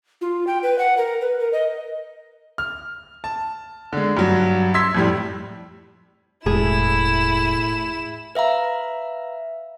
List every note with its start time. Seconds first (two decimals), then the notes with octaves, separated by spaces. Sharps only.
0.21 F4
0.47 G5
0.63 B4
0.79 F#5
0.97 A#4
1.21 B4
1.40 A#4
1.53 D#5
2.58 F6
3.24 A5
3.93 D3 G#3
4.17 G2 F#3
4.74 C6 E6 G#6 B6
4.95 F2 A2 G3
6.46 E1 A2 E4 G#4 E7
8.35 B4 E5 F5 A#5